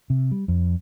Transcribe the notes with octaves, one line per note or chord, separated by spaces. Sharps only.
C3
G3
F2